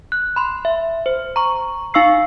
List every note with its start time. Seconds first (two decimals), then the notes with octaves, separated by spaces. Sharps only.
0.12 F#6
0.36 B5 C6
0.65 E5
1.06 C5
1.36 A#5 C#6
1.94 D#4 F5 C#6 E6 C7